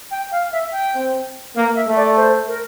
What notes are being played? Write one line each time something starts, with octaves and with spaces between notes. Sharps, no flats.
G5
F5
E5
G5
C4
A#3 F5
E5
A3
D5
C5
A#4